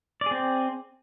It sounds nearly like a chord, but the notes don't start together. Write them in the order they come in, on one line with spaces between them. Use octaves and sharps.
D5 G#4 C4